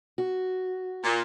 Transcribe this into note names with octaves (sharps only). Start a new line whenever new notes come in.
F#4
A#2